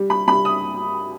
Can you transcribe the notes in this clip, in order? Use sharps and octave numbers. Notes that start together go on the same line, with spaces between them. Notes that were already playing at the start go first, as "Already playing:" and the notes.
Already playing: G3
B5
G3 B5
D#6